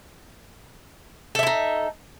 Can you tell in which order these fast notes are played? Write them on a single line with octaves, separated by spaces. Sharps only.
A4 E5 E4 D#4